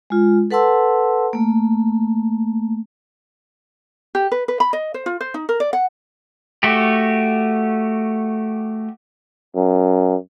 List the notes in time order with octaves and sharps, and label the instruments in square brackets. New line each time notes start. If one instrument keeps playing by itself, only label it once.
[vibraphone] G#3 F4
A4 B4 F#5 A5 C6 E6
A3 A#3
[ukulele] G4
B4
B4
B5
D#5
C5
F4
C5
D#4
A#4
D5
F#5
[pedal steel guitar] A3 F#4 G4
[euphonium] F#2